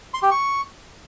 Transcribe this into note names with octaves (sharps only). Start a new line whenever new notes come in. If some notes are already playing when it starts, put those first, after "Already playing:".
C6
G4
C#6